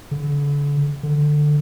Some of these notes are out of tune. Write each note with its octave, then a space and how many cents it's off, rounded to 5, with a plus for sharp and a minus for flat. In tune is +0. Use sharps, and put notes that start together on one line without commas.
D3 -35
D3 +15